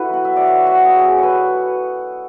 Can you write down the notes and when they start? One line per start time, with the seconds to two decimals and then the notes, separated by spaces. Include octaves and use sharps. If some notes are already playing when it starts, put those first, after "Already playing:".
Already playing: E4 F#4 A4 B4
0.09 B2 F#3 F#5
0.25 E5
0.36 D5
0.47 C#5
0.67 F#4
0.85 B2 F#3 G#4
0.99 G#4
1.05 A4
1.18 B4 C#5